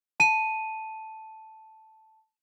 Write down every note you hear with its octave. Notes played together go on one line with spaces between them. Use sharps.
A5 D#7